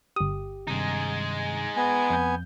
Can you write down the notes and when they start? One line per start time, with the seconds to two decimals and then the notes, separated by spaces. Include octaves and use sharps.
0.16 G1 G4 D#6
0.67 G2 C3 D#3 G#3 D#4
1.77 B3 G#5
2.10 F2 G6